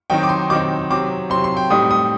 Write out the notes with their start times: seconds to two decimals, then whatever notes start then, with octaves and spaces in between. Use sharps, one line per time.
0.10 D#3 F#3 C4 D#4 G5
0.23 D6
0.29 C6
0.50 D#3 F#3 C4 D#4 D6
0.90 C3 F#3 C4 D6
1.30 C3 F#3 C4 C6
1.44 C6
1.57 G5
1.70 A2 G3 C4 D#4 D#6
1.91 D#6